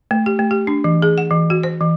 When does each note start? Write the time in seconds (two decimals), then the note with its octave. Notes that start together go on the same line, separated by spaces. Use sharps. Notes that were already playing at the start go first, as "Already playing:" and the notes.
0.11 A3
0.26 G4
0.39 A3
0.51 G4
0.67 D4
0.84 E3
1.02 G#4
1.18 F#5
1.31 E3
1.50 F#4
1.63 C5
1.81 E3